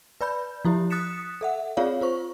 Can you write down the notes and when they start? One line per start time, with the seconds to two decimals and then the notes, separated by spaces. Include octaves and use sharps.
0.21 B4 D5 B5 G6
0.65 F3 E4 G4
0.90 D#6 F#6 A6 B6 C#7 E7
1.41 A4 E5 F#5
1.77 C4 F4 G#4 C#5 D5 F5
2.01 F4 C5 C#6